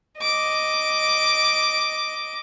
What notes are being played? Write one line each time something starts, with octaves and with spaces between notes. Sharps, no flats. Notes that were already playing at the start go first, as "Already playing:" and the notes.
D#5 D6